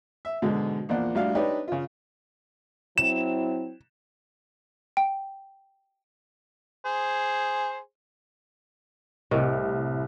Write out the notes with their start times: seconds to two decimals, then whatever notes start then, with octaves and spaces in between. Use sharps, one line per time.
0.25 E5
0.42 G#2 B2 D3 F#3 G#3
0.89 A#1 E2 F3 A#3 D5 F#5
1.15 A1 G3 D4 F#4 F5
1.35 D4 D#4 G4 B4 C#5 D5
1.68 C#3 F4
2.98 F#3 C4 E4 E7
4.97 G5
6.85 G#4 C5
9.31 C2 A2 C3 A#4 D#5 C#6